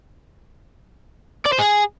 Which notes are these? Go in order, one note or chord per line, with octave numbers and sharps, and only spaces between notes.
D5
C5
G#4